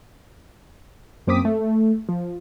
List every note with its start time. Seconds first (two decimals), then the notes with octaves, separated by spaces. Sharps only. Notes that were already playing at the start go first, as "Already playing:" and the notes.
1.27 F#2 A#3 C4 D6 D#6 B6
1.45 A3
2.09 F3